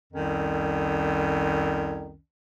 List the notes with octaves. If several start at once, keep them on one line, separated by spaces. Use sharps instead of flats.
C2 F2 D#3 C#4